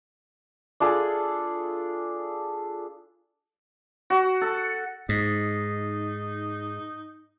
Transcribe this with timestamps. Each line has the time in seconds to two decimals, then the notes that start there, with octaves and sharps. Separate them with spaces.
0.80 D4 F4 G#4 A4
4.10 F#4
4.41 A4
5.09 G#2 D#4